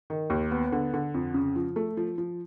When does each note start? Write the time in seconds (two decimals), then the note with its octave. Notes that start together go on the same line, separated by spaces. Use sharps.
0.10 D#3
0.30 D#2
0.51 B3
0.72 D3
0.94 D3
1.14 F2
1.34 C#3
1.56 F3
1.76 A3
1.97 F3
2.18 F3